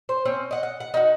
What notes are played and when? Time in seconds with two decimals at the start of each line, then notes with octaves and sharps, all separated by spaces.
0.09 C5
0.25 C4 C#4
0.51 D#5 F#5
0.63 F#5
0.80 F#5
0.94 D#4 F#4